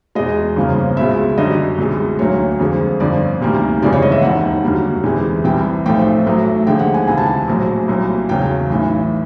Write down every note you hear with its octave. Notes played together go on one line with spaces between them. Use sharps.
E2 B2 G#3 D#5
G1 F2 C#3 F3 A#3
C#2 B2 G#3 E5
F#2 D3 G3 D#5
C2 B2 G#3
D2 D3 F#3 A#3 C#5
F2 D3 F3 G#3
G1 F2 D3 F3 D5
D2 C3 D#3 G3 A#3
G1 F2 C#3 E3 G#3 D5
C#5
D#5
E5
E1 D#2 D#3 F#5
F#2 D3 G3 A#3
E2 C3 E3 G#3
C2 C3 E3 G3 G5
B1 A2 F3 A3 G5
A1 A2 F#3 A3
D#2 D3 F3 G#3 G5
F#5
G#5
C#2 C3 E3 G#5
A5
G#5
A#1 A2 F#3
C2 A#2 F#3
E2 C#3 F#3 G5
B1 A2 E3